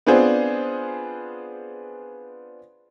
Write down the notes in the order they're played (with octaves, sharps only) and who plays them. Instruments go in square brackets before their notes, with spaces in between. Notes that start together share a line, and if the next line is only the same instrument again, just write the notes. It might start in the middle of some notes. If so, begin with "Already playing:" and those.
[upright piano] B3 C4 D4 F4 G#4 C5